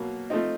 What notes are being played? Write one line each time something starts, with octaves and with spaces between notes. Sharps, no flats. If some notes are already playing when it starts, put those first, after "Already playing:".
Already playing: B2 F#3 A#3
F3 A3 C4 D#4